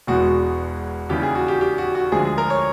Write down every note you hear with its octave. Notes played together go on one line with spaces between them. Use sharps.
E1 E2 B2 G#3 F#4
D#2 C#3 E3 G3 G4
G#4
F#4
G4
G4
F#4
F#4
D2 D3 F3 G#3 G#4
G#4
A#4
C#5